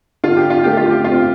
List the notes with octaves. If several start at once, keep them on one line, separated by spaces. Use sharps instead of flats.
D3 F4
G4
F4
A3 G4
F4
G4
C4 F4